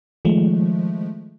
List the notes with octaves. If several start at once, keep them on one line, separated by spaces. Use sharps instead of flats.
D#3 F3 G#3 A3